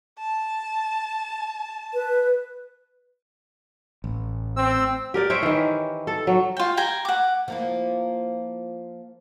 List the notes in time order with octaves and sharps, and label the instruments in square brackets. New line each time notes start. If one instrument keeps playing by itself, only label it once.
[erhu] A5
[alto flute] B4
[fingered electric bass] A1
[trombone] C4 [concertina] E6
[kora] G4 A#4 D5
C5 C#5 E5 G5
D#3 E3
A4
F#3
[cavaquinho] F4 G5
G5 G#5 A#5
F#5 D6
[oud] F3 A#3 E4